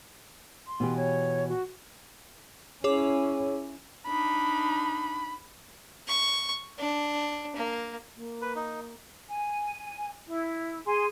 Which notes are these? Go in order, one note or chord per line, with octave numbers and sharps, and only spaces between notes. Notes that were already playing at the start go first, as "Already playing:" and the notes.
C6
B2 E3 G4
C#5
F#4
C#4 E4 G#4 C#5 D6
D4 D#4 B5
C#6
D4
A#3
A#3
B4
D#4
G#5
E4
G#4 G#5 C6